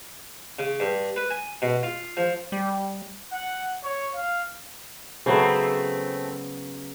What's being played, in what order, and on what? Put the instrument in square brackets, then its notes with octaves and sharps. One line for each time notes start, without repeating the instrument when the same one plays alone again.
[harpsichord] C#3
G2
B4
G#5
B2
F4
F3
[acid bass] G3
[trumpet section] F#5
C#5
F5
[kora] C#3 F#3 B3 [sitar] A3 C4